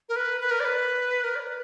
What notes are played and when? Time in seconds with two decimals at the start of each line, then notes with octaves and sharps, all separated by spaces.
0.09 A#4
0.16 B4
0.41 B4
0.51 A#4
0.60 D5
0.65 B4
1.24 A#4
1.35 D5
1.40 B4